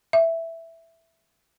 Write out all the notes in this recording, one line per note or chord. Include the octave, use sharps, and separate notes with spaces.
E5